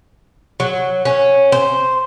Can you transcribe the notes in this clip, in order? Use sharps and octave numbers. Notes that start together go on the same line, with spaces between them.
F#3
C#4
C5